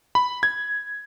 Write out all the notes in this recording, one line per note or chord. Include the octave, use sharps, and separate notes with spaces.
B5
G#6